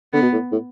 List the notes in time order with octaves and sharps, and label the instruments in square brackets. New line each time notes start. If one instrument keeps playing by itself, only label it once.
[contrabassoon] D3 [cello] B3
[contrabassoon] B2
A2
A2